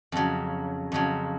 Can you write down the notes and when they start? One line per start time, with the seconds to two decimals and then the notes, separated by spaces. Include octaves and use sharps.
0.12 F2 C#3 F#3
0.92 F2 C#3 F#3